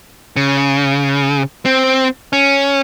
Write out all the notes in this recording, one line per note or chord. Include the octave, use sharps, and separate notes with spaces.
C#3
C4
C#4